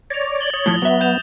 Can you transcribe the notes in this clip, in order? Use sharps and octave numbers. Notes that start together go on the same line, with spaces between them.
C#5 D5 A#6 F7
A6 F#7 G7
C#5 D#6 A6
A2 F3 G7
F#3 B3 E5
G6 E7 F7